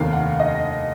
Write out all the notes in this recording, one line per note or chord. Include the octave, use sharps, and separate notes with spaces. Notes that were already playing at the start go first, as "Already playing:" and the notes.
Already playing: F1 D#2 D#3 F5
F#5
D#5